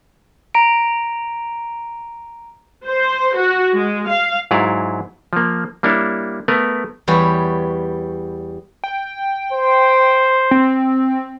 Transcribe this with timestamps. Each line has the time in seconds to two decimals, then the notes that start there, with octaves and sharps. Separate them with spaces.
0.55 A#5 D7
2.86 C5
3.37 F#4
3.77 G#3
4.10 F5
4.51 G#2 F#3 E4 G#4 D5 F5
5.33 F3 A#3
5.83 G3 A#3 D4 E4 C#5
6.48 A3 B3 A#4 B4
7.07 E2 G3 B4 C#5
8.84 G5
9.53 C5
10.51 C4